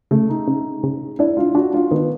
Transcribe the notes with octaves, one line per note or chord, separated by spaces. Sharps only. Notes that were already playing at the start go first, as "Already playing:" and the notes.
C#3 A3
D#4
C#3
C#3
D4 E4
F4
D4 F#4
F4
D#3 B3